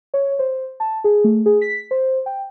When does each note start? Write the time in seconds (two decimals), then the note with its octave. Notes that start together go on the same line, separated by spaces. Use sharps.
0.14 C#5
0.39 C5
0.80 A5
1.04 G#4
1.24 A3
1.46 G#4
1.61 B6
1.91 C5
2.26 G5